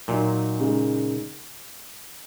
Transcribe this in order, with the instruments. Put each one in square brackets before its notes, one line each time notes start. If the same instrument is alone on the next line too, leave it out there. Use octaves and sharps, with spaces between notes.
[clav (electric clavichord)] A#2 [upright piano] F#3 D#4
[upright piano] C#3 G#3 D#4